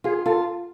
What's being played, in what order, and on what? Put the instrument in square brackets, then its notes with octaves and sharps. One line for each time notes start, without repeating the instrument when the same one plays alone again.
[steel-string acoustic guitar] F4 [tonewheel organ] G#4
[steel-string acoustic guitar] F4 [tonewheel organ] A4